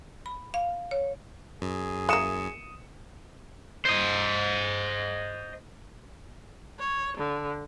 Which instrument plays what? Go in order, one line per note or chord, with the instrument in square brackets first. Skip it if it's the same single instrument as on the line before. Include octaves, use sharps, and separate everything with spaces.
[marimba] B5
F5
C#5
[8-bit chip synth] F#2 [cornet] G#4
[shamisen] E3 A#3 [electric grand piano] D#6 C#7 E7
[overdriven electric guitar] C5 D#5
[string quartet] C#5
D3